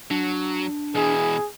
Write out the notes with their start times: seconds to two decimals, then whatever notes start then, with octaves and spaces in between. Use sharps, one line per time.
0.11 F#3 D4
0.96 B2 E3 G#4